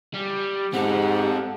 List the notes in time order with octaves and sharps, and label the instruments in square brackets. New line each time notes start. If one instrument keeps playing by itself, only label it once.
[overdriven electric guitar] G3
[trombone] G#2 [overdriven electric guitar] C4 A4 [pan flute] G4 [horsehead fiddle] F#5